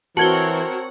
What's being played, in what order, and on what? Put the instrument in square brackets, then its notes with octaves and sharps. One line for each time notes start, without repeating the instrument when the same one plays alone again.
[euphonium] E3 [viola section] C4 A#4 C#5 [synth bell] F#4 [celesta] A5 G#6 G7